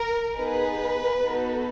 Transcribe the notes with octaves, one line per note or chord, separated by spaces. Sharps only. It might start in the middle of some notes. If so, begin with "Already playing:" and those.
Already playing: A#4
B3 D#4 G#4 B4
B3 D#4 F#4 A4